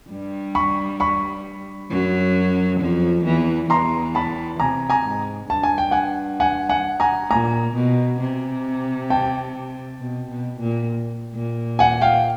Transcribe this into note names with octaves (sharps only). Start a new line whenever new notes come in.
G2 G3
B5 C#6
B5 C#6
F#2 F#3
F2 F3
E2 E3
E2 E3 A#5 C6
A5 B5
C3 G#5 A#5
G#5 A#5
G#2
G2 A5
G#5
G5
F#5 G#5
F#5 G#5
F#5 G#5
G#5 A#5
A#2 G#5 A#5
B2
C3
G5 A5
B2
B2
A#2
A#2
F#5 G#5
F5 G5